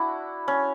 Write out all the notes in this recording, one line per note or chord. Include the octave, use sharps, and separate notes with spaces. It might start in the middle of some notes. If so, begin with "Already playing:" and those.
Already playing: D4 E4 F#4
C#4